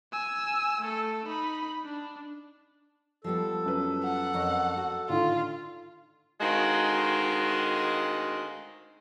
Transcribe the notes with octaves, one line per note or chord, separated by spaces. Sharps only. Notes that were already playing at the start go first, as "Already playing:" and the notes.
G#5 E6
A3 A4
D#4 B5
D4
F3 G3 B3 A4
F#2 B4
F#5
F2 A#4 C#5
F#4
A2 D3 D#3 F4
D2 D#3 G#3 C4 F#4 F5